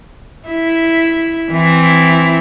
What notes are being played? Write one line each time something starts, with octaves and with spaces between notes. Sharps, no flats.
E4
E3 C4 E4